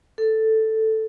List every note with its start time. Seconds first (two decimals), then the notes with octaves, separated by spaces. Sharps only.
0.18 A4